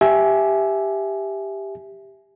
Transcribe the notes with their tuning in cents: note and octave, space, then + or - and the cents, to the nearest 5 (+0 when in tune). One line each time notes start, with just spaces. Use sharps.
G4 +5 E5 +0 G#5 +20